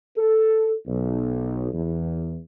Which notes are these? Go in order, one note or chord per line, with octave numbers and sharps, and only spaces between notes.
A4
B1
E2